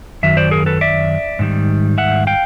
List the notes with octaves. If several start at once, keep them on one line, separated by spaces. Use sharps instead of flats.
F#2 D#3 F#3 E5
C5 D5
G#4 A#4
A4 B4
D5 E5
G#2 D#3 G3
E5 F#5
F5 G5